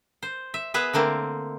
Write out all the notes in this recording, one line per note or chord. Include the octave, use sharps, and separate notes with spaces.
C5
E5
B3 G#4 B4 E5
D3 A3 A#3 C4